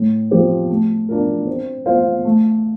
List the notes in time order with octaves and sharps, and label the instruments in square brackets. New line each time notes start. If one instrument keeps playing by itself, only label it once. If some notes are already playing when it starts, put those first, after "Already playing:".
Already playing: [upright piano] A2
F3 C4 G4 C5
A3
D4 F4 A#4
C4
F4 C5 F5
A3